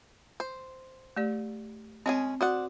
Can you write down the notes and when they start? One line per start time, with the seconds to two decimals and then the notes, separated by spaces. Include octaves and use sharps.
0.40 C5
1.17 A3 G4 D5
2.06 G#3 C4 C#4 G#4
2.41 F#4 C5 D5 F#5